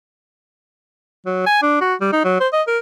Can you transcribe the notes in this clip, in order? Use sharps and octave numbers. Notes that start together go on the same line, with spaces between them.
F#3
G#5
D4
F#4
G3
D#4
F#3
C5
D#5
A#4